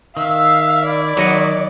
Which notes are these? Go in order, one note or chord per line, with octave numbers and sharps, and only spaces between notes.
D#3 E5 F5 E6
E4 D5
D#3 F#3 D#5 F#5